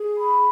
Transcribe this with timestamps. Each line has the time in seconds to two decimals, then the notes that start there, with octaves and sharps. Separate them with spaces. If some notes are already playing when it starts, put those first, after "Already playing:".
Already playing: G#4
0.17 B5